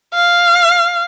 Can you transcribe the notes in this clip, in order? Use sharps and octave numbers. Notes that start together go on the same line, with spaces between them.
F5